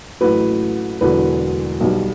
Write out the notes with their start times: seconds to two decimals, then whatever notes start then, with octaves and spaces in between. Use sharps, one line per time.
0.21 A1 A2 F#3 B4
1.00 E1 E2 D3 F#3 B4
1.81 B1 B2 G3